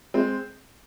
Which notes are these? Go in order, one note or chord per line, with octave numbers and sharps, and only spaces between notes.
G#3 C4